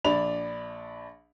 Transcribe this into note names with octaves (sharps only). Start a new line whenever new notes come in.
A#1 D4 D5 B5 F7